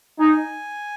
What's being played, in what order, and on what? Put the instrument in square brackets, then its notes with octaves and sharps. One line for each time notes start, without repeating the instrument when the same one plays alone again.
[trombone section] D#4 [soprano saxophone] G#5